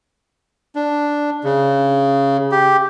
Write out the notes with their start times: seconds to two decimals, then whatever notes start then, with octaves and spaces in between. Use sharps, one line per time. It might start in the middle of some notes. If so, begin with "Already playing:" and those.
0.75 D4
1.44 C#3
2.52 G4